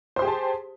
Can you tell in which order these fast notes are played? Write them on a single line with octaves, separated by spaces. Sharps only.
C5 C6 G4 G#4 A5